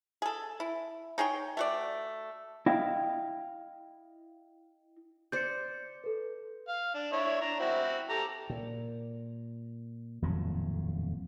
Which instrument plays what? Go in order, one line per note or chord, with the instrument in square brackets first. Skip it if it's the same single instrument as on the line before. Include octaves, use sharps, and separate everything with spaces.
[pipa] G#4 A4
E4
D#4 G#4 C#5 G5
A3 F#4 D5
[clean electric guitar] E4 D#5 F5 G5
[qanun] C5 D5 [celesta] G6 C#7
[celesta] A4 B4
[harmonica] F5
D4
D4 E4 C#5
D4 A#5
C4 E4 F#4
G4 A4 A#5
[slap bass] A#2
D#1 F2 A2 F#3